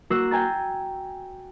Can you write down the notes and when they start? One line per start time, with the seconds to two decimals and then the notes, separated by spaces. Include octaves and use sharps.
0.10 A#3 F#4 F#5 E6 C7 E7
0.31 G5 G#5 A#5 A6